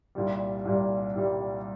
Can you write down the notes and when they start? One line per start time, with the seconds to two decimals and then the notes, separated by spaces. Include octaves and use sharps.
0.15 C2 A#2 G3
0.65 C2 A#2 G3
1.15 C2 A#2 G3